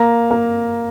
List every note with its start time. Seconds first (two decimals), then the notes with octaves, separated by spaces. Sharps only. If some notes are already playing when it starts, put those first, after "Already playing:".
Already playing: A#3 A#5
0.31 A#3